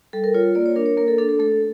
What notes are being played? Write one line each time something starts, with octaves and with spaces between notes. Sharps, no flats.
G3 A4
A#4
F4 C#5
A#3 D5
C#5
D4 A#4
C#5
A#3 A#4
A4
D4 A4
A4
A3 A4